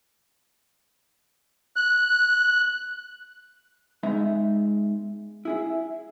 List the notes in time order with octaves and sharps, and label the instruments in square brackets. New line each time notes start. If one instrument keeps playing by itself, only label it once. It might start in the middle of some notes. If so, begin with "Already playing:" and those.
[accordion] F#6
[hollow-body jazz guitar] G#3 B3 D#4 E5
E4 G#4 E5